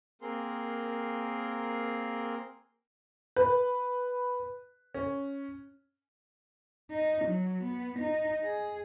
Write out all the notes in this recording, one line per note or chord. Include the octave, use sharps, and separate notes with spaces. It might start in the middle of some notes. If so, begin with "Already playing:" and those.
A#3 C4 G#4 A#4 C6
B4
C#4
D#4
F#3
B3
D#4
G#4